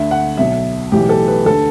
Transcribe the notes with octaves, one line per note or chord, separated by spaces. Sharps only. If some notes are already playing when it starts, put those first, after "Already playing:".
Already playing: D2 D3 E5
F#5
B1 B2 E5
B1 A2 E3 G4
A4
B4
D2 D3 A4